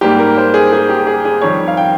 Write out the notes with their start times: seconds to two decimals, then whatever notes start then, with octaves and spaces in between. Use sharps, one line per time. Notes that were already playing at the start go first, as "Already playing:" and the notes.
0.01 G#2 G3 A#3 G4
0.19 A#4
0.37 C5
0.54 G#4
0.73 G#4
0.89 G4
1.07 G#4
1.25 G#4
1.42 F2 D#3 G3 C#5
1.68 F5
1.77 G5